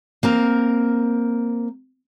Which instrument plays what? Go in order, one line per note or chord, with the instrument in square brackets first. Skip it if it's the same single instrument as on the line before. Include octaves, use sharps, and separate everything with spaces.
[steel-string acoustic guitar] A#3 C4 A#4